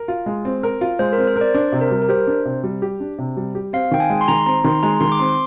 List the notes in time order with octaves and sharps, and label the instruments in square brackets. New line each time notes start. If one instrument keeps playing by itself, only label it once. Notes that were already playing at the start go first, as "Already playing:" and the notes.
Already playing: [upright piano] A#4
F4
G#3
C4
A#4
F4
[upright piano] G#3 [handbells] C5
[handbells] A#4
[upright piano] C4
[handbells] C5
[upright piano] A#4
[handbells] D5
[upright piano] D4 [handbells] C5
[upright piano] C3
[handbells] A#4
[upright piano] G3
[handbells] A#4
[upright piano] G4 [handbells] C5
[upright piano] D4
C3
G3
G4
D4
C3
G3
G4
[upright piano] C4 [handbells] F5
[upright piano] D#3 [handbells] G5
[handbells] G#5
[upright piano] G#3
[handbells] C6
[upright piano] D#3 [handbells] A#5
[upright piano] C4 [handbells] A#5
[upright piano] D#3 [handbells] C6
[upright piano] G#3 [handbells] A#5
[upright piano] D#3 [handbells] C6
[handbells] D6
[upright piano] C4 [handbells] C6